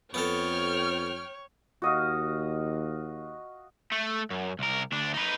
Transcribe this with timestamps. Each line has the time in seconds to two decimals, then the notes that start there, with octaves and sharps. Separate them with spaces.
0.14 F2 B3 A4 C#5 G5 F6
1.82 D#2 F#4 D#5 F5
3.92 A3
4.30 F#2
4.59 C2 A#4
4.92 D2 D4
5.14 D#4 B4